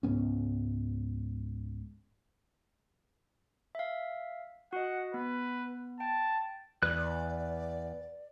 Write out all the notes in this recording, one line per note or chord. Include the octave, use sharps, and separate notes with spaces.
C#2 G#2 B3 C#4
E5 F5
F#4 D#5 F#5
B3 B4
G5 A5
E2 B4 D5 F#6